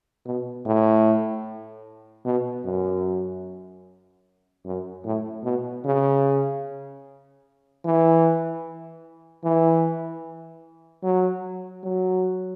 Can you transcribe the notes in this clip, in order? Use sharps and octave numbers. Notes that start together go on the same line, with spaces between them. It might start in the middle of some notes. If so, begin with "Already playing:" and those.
B2
A2
B2
F#2
F#2
A2
B2
C#3
E3
E3
F#3
F#3